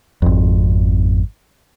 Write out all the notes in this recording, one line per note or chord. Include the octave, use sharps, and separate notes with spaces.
G#1 F2